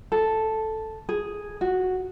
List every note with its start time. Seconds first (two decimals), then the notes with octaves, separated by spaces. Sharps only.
0.12 A4
1.09 G#4
1.61 F#4